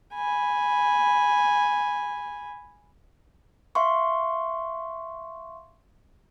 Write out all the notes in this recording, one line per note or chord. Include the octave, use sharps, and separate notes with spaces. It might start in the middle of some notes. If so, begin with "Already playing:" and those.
G#5 B5
E5 F5 C6 C#6